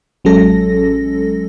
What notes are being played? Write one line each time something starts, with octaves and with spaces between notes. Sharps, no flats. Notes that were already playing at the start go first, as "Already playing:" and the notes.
A1 F#3 G#3 C#4 A4 A#6